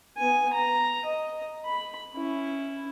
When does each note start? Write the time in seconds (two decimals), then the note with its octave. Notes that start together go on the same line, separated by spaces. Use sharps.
0.17 B3 G#5
0.53 A#5
1.06 D#5
1.65 B5
2.14 C#4 E4